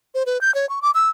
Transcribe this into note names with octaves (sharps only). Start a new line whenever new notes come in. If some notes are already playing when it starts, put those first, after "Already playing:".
C5
B4
G6
C#5
C#6
D6
E6